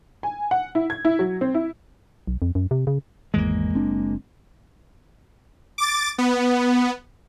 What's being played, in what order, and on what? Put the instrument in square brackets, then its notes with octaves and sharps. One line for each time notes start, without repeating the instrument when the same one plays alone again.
[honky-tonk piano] G#5
F#5
E4
G#6
E4
F#3
C4
E4
[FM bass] B1
F2
F#2
C3
C#3
[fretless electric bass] G#1 E2 [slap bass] G#3 A#3
[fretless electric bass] F#1 C4 D4
[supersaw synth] D6 A6
B3